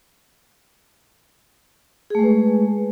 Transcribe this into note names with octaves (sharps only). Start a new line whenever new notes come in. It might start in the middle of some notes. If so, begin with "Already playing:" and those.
G#3 A3 G#4 B4